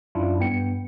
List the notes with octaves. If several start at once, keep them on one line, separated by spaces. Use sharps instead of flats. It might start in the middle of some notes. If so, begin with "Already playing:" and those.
F#2 D4 E4 F4
G2 B3 G5 C#7